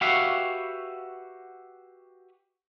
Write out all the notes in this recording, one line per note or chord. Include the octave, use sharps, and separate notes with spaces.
F#4 G4 B4 C#5 E5 F5